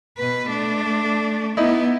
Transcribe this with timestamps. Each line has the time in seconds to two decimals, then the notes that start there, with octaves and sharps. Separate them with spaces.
0.18 B2 B4
0.48 A3 D4
1.57 B3 D#4 E4